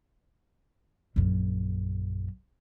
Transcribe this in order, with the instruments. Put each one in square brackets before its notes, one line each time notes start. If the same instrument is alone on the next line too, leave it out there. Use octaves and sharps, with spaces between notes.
[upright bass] A#1 F#2